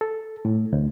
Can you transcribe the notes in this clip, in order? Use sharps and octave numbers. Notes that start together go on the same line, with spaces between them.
A4
A2
D2